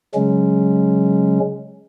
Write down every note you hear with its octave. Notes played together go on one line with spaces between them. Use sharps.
C#3 F#3 G#3 C#4